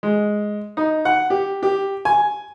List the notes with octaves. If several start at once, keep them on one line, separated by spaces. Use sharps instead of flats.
G#3
D#4
F#5
G4
G4
G#5